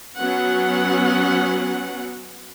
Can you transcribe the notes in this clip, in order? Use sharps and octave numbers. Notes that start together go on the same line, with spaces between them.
F#3 B3 C#4 F#5